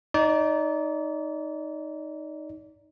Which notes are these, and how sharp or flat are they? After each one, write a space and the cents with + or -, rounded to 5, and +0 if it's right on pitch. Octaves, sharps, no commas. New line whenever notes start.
D#4 +0 D5 -30